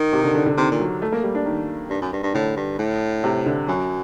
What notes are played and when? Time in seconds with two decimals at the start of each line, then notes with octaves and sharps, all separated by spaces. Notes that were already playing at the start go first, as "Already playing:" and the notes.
Already playing: D#3
0.13 C3
0.24 D3
0.35 D3
0.46 D3
0.57 C3 D#3
0.71 A#2
0.80 F#3
1.02 A3
1.12 A#3
1.24 G3
1.35 D4
1.46 D#3
1.90 G2
2.02 F#2
2.13 G2
2.23 G2
2.34 A2 D3
2.57 G2
2.79 A2
3.24 C3
3.46 D3
3.67 F#2 F#3